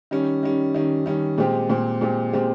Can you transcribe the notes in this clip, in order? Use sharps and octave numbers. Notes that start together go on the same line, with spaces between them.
D#3 G3 C#4
D#3 G3 C#4
D#3 G3 C#4
D#3 G3 C#4
A#2 G#3 C4 G4
A#2 G#3 C4 G4
A#2 G#3 C4 G4
A#2 G#3 C4 G4